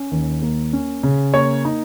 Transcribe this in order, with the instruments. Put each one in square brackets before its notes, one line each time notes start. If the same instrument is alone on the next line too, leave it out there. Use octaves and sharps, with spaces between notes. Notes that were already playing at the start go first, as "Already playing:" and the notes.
Already playing: [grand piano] C#4
D#2
A#3
C#4
C#3
A#3 C#5
D#4